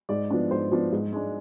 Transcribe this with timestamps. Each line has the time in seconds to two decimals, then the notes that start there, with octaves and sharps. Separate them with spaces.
0.09 G#2 D5
0.31 F3 B3 D4
0.51 G#2 C5
0.72 F3 B3 D4
0.92 G#2
1.12 G#3 D4